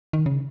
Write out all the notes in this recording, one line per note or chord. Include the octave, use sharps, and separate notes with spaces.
D#3
C#3